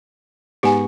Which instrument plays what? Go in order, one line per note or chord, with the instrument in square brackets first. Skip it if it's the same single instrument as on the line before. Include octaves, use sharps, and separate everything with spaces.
[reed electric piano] G#2 B3 C#6 [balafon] G4 G#5